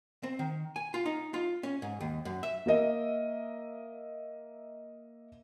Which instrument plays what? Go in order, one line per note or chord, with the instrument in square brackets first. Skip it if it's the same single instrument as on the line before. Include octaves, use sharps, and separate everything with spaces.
[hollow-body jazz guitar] C4
D#3
G#5
F4
D#4
F4
C#4
G#2
D#2
F#2
E5
[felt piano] A#3 A#4 D#5 E5